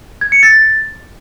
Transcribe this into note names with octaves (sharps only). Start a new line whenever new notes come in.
G#6
C#7
A6